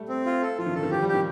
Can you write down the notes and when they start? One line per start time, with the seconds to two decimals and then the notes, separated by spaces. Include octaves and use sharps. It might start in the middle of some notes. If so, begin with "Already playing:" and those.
Already playing: G3 A3
0.09 C4
0.26 F4
0.42 A4
0.58 F3 F4
0.66 D#3
0.75 D3 A4
0.83 D#3
0.91 F3 G4
1.02 G3
1.09 G4
1.14 D#3